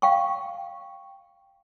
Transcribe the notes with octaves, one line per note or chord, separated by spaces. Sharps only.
F5 G5 C#6